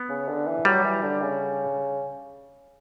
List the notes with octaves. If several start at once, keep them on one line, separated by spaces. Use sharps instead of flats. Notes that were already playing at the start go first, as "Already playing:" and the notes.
Already playing: B3
C#3
D3
E3
F#3 G3
E3
D3
C#3